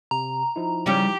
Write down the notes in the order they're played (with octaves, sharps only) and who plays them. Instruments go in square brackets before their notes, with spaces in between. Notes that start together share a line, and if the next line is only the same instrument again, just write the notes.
[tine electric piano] C3 [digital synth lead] A#5
[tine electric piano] F3 D#4 E4
[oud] C#3 G3 C#4 [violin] G4